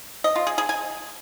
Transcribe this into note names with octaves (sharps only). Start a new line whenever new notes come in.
D#5
F4
G#4
G#4
G#5